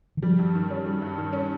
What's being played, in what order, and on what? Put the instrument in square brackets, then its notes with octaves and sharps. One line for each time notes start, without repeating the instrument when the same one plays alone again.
[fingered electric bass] D#3
[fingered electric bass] F3 [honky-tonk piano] G3
[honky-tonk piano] G2
D#3
C#4
G3
G2
D#3
C#4